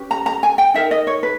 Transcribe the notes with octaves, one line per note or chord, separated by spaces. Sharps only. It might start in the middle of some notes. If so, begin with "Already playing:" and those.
Already playing: C#4 G4 B4
A#5
A#5
G#5
G5
D#4 A#4 E5
D#5
C#5
B4